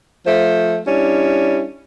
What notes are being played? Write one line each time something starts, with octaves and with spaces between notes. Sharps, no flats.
F3 A3 C5
G3 C#4 D4 E4